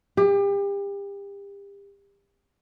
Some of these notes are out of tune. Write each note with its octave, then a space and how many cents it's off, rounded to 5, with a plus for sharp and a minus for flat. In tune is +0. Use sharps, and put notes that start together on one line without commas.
G4 +35